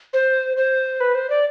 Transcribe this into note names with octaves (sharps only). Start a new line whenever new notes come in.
C5
C5
B4
C5
D5